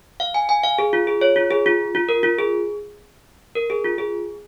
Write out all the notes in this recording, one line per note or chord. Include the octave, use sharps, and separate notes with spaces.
F5
G#5
G#5
F5
G#4
F4
G#4
C#5
F4
G#4
F4
F4
A#4
F4
G#4
A#4
G#4
F4
G#4